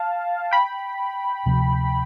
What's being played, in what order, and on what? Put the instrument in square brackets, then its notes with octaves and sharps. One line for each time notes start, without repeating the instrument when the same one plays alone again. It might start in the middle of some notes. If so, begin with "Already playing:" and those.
Already playing: [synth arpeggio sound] F5 A5
G5 B5
[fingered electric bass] D2 C3 F3